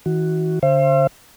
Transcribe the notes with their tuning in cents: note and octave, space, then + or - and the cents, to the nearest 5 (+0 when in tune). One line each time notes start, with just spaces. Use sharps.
E3 -45 F#4 +0
D3 -30 C5 +25 E5 +45